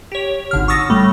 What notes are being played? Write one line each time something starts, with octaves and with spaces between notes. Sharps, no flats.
G4 C#5
G#1 D3 F6
C#6 D#6 E6 A6 A#6
A2 G3 A3